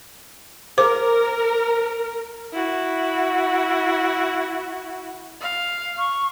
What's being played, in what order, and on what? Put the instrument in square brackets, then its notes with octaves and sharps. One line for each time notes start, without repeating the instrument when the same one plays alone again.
[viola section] A#4 [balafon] C5 D6
[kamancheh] E4 F#4
[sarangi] F5
[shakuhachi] C#6